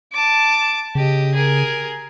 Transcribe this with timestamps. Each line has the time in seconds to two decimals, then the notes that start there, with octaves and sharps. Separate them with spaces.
0.12 A5 D6
0.95 C#3 G4 D#5
1.35 G#4 A#4